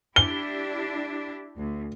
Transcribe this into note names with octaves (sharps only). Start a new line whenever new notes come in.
D4 E4 G4 G7
D2